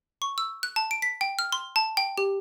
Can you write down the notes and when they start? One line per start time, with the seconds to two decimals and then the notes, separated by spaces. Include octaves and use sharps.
0.22 C#6
0.38 E6
0.63 F#6
0.76 A5
0.91 D7
1.02 B6
1.21 G5
1.39 F6
1.52 C6
1.76 A5
1.97 G5
2.18 G4